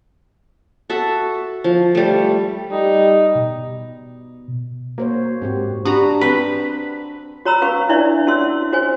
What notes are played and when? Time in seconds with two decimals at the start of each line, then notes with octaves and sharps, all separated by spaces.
0.90 F#4 A4 E5
1.64 F3
1.95 G3 A3
2.71 G3 D#4
3.35 B2
4.98 A#3 F#4 C5 C#5
5.42 G#2 C4 F#4 G4
5.85 D4 F#4 G4 B4 A#5
6.21 C4 B4
7.45 F#4 C#5 A#5 B5 E6
7.62 C#4 F#4 B4 F5 C#6
7.89 D4 E4 B4 C#5 D5 E5
8.27 C#4 F#4 C#5 C6 E6
8.72 F#4 C5 C#5 G#5